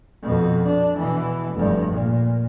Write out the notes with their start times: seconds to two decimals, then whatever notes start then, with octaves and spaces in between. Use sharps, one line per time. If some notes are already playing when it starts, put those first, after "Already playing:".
0.23 F2 B2
0.66 D4
0.97 B2 E3
1.54 F1 G2
1.92 A#2